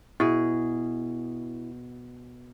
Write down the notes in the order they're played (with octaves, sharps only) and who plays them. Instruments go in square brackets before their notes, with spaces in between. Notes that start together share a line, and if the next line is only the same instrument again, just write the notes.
[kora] B2 G#4 [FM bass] E4